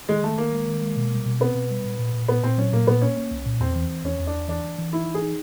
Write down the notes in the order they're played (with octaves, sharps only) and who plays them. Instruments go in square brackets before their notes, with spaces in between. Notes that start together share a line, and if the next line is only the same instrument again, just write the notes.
[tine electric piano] D#3 [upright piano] G#3
[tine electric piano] D#3 [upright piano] A3
[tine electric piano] D#3 [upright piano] A#3
[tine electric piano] G#3
D#3
G#3
B2
G3
B2
[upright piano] B3 [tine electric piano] C4
[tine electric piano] B2
G3
A#2
A#2
A#2
[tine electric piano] A#2 [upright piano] B3
[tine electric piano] A#2 [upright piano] C4
[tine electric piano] F#3 [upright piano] C#4
[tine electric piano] A#2 [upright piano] A#3
[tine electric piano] A#2 [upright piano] B3
[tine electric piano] A#3 [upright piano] C#4
[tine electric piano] A#3
C2
A#2
[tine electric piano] E2 [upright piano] C4
[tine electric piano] E3
E3
[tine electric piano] E2 [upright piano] C#4
[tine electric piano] E2
[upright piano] D4
[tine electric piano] E2
[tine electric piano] E3 [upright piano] D4
[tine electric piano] E3
E3
[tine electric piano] D#4 [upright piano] E4
[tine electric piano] E3
[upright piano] G#4
[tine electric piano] D#4